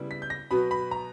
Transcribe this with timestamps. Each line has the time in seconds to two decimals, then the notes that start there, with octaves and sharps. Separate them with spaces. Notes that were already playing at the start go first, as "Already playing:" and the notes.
Already playing: C#3 G3 B3 E4
0.11 B6
0.22 G6
0.30 A#6
0.51 B2 F#3 B3 B5
0.71 B5
0.91 A#5